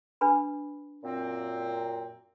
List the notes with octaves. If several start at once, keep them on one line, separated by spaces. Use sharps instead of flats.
D4 B4 B5
F#2 A#2 C4